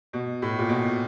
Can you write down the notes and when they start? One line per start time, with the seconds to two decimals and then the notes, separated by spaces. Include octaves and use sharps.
0.13 B2
0.42 A2
0.59 A#2
0.69 B2